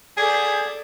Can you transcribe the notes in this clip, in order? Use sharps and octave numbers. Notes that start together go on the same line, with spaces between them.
G#4 A4 D5